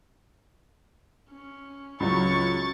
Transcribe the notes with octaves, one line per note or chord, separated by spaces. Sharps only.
C#4
C#2 F#3 C#6 A6